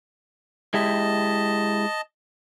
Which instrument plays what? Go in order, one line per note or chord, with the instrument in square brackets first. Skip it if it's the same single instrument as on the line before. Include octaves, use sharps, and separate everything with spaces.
[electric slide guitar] G#3 E4 G4 [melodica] D#5 A5